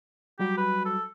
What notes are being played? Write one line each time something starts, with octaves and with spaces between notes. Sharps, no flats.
F#3 G3 F#4 G4
B4
A4